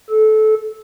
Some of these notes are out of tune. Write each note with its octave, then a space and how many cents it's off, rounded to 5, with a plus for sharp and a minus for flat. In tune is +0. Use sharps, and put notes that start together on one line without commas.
A4 -20